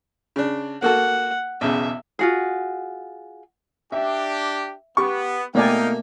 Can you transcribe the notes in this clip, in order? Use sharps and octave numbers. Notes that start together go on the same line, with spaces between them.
C#3 D4
A#3 F#4 A4 F#5
B1 E2 C#3 E5
F4 F#4 G#4
D4 G4 E5
B3 G4 C#6
B2 A3 A#3 D#4 D5 F5 G5 G#5